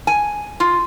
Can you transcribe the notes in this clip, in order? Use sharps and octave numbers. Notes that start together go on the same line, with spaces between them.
G#5
F4